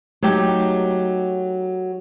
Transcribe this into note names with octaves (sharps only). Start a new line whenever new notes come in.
F#3 A3 D#4 G4